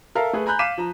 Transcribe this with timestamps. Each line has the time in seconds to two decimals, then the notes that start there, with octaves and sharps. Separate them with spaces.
0.15 A4 A#4 E5 F5 A5
0.33 A3 G#4 B4
0.46 G#5 A#5 B5 F#6 G6
0.59 F5 D6 B6 D#7 E7
0.78 F3 A#5